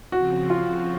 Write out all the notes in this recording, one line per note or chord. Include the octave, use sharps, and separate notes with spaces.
C#3 F3 C4 F#4
F4